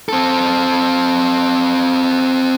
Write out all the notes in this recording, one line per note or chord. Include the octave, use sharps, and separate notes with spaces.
C4 A4